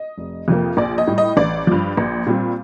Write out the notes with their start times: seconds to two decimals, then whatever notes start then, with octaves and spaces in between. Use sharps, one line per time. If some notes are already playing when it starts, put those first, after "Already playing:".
Already playing: D#5
0.18 F1
0.48 F2 C3 F3 A#3
0.77 A#1 D5
0.98 D#5
1.07 A2 G3
1.18 D#5
1.37 A1 D5
1.67 G2 F3
1.97 A#1
2.27 A#2 G3 C4